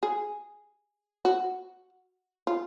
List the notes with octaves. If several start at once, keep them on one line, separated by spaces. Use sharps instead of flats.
G#4
F#4
F4